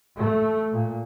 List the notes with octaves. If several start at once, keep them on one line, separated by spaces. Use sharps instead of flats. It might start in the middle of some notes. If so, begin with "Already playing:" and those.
A3
A#2